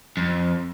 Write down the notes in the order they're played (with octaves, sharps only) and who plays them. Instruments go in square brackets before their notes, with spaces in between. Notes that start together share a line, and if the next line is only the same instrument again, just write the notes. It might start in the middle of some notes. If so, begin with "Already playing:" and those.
[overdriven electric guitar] F2